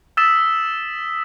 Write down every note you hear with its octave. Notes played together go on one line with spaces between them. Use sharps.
D#6 E6 A6 B6 E7